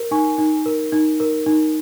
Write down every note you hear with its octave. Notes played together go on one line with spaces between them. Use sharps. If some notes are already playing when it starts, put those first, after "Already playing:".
Already playing: A#4
D#4 G#5 C#6
D#4
A#4
D#4
A#4
D#4